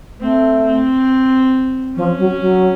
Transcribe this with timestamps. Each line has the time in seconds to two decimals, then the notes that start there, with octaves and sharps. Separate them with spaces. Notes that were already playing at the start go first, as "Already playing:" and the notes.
0.20 A3 C4
0.65 C4
1.96 F3 C#4
2.19 F#3
2.40 F#3